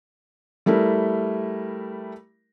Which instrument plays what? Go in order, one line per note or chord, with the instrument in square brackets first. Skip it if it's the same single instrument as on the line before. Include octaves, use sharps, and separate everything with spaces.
[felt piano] G3 A3 E4 A#4